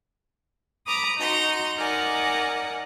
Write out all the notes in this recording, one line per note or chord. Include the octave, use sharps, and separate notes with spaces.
A#5 B5 D6 D#6
D#4 F#4 A#5 C6
D#4 A#4 D5 F#5 G#5